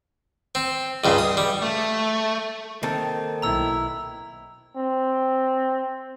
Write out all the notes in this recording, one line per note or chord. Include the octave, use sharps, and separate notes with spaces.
C4
C#2 G2 C#3
D#6
G3
A3
D#3 A#3 C4 A4
B1 E4 A#5 E6
C4